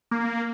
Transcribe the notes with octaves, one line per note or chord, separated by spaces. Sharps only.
A#3